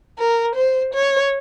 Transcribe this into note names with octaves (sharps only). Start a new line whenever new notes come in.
A#4
C5
C#5